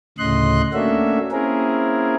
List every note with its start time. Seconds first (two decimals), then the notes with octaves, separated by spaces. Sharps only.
0.18 D2 A2 C#3 D#5 C6 F#6
0.74 A3 A#3 C#4 D4 F#4 E5
1.31 A#3 C4 C#4 E4 G#4 A#4